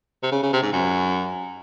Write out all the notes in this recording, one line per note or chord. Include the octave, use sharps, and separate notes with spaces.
C3
C#3
C#3
C3
G#2
F#2